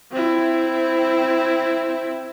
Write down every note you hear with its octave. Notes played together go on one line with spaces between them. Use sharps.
C4 E4